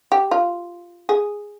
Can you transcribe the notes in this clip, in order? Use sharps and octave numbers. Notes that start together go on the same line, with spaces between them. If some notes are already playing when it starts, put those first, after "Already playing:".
G4
F4
G#4